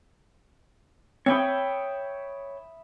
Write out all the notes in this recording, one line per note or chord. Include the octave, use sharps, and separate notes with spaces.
C4 C#5 E5 G5 B5 D#6